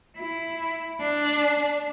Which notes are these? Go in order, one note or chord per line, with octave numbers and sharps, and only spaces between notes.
E4
D4